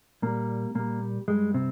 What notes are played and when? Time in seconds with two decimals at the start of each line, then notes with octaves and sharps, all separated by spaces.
0.22 A#2 G3 A#3
0.75 A#2 G3 A#3
1.28 G2 G3 G#3
1.54 C3 C4